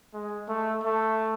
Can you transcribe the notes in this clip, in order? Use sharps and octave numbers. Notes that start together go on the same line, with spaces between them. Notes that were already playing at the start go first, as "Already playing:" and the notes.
G#3
A3
A3